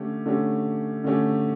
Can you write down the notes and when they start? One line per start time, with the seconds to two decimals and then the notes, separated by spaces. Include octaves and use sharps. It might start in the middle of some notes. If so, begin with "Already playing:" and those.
Already playing: D3 A3 C#4 G4
0.26 D3 A3 C#4 G4
1.04 D3 A3 C#4 G4